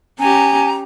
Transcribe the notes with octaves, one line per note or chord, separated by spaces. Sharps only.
C#4 G4 G#5 A#5